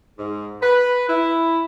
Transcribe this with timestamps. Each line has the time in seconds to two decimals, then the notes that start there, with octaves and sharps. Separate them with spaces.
0.18 G#2
0.61 B4
1.08 E4